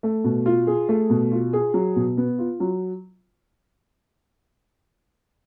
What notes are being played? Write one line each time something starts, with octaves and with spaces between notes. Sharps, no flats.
A3
B2
F4
G#4
A3
B2
F4
G#4
F#3
B2
B3
F4
F#3